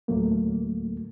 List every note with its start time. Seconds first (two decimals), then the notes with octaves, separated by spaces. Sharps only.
0.08 D2 A2 F#3 A3 A#3